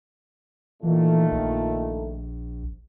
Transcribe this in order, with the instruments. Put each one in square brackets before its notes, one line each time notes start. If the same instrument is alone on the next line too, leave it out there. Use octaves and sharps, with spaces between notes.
[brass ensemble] A#2 D#3 A3 [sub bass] E3
[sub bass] A#1